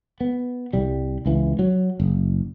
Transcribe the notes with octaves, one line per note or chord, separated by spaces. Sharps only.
B3
C2 G3
C#2 E3
F#3
F#1